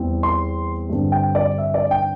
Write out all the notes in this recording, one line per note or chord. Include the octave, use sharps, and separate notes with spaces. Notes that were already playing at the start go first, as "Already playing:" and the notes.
Already playing: E2 E3 G3 C4
C6
G2 D3 C4
G5
D5
E5
D5
G5